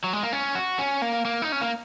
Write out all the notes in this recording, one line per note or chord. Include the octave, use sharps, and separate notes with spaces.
F#3
G#3
A#3
C#4
F#4
C#4
A#3
A#3
D#4
C#4
A#3